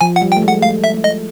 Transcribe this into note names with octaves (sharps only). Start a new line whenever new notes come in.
F3 G#5
F#5
G3
G5
A3
G#3
F#5
A3 F5
E5
A3
D#5